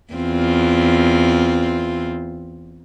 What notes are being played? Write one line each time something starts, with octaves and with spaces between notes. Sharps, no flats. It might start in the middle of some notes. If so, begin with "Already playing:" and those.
E2 C4 F4